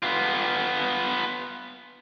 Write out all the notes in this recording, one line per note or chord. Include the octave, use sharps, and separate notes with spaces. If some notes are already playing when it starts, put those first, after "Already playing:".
B3 F4